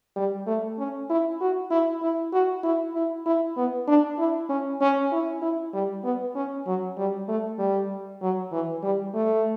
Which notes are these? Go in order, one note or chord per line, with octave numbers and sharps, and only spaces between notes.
G3
A3
C#4
E4
F#4
E4
E4
F#4
E4
E4
E4
B3
D4
E4
C#4
C#4
E4
E4
G3
B3
C#4
F#3
G3
A3
G3
F#3
E3
G3
A3